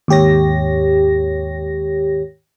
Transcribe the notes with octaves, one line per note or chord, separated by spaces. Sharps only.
D#2 G#2 G4 C#5 A#6